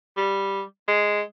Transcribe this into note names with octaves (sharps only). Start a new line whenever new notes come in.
G3
G#3